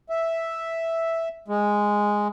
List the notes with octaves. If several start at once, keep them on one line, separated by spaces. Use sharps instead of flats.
E5
G#3